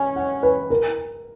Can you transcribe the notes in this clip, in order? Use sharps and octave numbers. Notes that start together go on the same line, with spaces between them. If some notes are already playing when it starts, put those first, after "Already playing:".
Already playing: C#4 G#5
F#5
B4
A#4